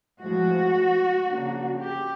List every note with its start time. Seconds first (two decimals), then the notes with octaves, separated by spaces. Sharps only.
0.22 A2 F3 G#3 F#4
1.27 C#3 F3 A#3 D4
1.80 G4